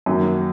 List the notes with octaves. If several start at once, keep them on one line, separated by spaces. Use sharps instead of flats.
F#2 D#3 F#3 A#3